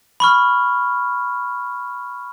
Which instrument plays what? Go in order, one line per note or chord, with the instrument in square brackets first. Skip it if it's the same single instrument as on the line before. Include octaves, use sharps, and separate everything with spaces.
[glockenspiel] B5 C#6 F6